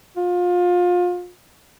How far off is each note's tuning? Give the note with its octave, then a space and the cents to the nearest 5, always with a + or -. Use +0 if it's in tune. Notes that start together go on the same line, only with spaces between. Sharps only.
F4 +30